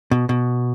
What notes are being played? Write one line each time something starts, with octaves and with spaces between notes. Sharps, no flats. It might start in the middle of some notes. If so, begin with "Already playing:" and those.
B2
B2